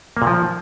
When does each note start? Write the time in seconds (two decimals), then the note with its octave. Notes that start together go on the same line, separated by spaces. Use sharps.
0.17 A#3
0.22 A#2
0.27 F3